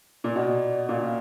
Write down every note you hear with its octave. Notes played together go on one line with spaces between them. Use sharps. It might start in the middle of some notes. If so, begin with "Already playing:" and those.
A#2
B2 D5
A#2 F5